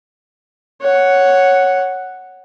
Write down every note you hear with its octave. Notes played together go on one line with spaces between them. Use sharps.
C#5 F#5